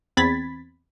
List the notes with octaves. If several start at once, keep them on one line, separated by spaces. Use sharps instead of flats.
E2 C4 B5 G#6 A6 B6